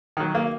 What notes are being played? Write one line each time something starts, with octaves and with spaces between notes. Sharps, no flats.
D#3 F#3
A#3